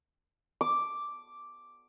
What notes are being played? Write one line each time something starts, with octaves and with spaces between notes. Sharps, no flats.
D6